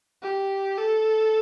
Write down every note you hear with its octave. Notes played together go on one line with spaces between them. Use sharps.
G4
A4